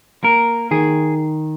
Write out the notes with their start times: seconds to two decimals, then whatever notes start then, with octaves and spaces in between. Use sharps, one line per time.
0.23 A#3 A#4
0.71 D#3 G#4